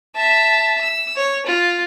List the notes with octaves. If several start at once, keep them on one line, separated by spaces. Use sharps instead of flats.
E5 A5
E6
C#5
F4